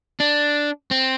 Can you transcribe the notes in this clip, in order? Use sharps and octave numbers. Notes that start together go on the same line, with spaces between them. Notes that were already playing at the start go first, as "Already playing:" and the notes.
D4
C4